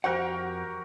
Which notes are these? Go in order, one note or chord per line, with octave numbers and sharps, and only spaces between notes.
F2 F#4 G4 A#4 C5 F#5